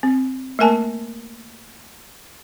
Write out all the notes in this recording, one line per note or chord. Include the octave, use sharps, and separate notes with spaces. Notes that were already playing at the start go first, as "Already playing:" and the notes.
C4
A3 A#3 A#4 G#5 A5